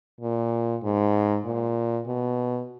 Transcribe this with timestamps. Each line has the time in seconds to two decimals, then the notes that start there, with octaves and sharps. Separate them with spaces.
0.21 A#2
0.83 G#2
1.45 A#2
2.07 B2